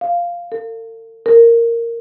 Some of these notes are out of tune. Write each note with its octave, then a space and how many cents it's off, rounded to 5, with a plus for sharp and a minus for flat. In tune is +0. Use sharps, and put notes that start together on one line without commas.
F5 -5
A4 +45
A#4 -5